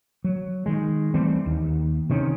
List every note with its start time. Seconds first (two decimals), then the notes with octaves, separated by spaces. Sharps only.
0.24 F#3
0.66 D#3 G#3
1.14 E3 G3 A3 C4
1.46 D#2
2.10 C3 D#3 C#4